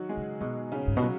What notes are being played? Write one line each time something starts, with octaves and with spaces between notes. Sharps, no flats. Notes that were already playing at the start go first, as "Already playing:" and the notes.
Already playing: D#3 F#3 D#4 F#4
G#3 G#4
C#3
B2 G#3
C#3 C#4
G#2
B2
F#3 F#4